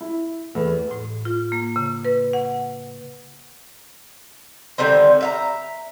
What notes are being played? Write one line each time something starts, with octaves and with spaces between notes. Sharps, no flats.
E4
E2 A3
A2
F4
A#3
C#3
B4
F#5
D3 D#3 G3 C4
E5 F5 A#5